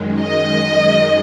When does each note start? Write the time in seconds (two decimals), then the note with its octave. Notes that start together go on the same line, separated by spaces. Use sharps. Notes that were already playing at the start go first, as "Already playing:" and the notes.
Already playing: F#2 D#3 G#3
0.20 D#5